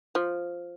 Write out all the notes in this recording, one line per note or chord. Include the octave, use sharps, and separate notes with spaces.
F3